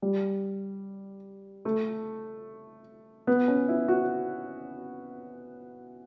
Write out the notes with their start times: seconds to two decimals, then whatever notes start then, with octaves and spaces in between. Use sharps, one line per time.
0.02 G3
1.65 A3
3.27 B3
3.48 C#4
3.69 E4
3.88 F#4